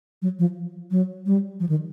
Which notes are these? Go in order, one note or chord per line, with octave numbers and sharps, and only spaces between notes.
F#3
F3
F#3
G3
F3
D#3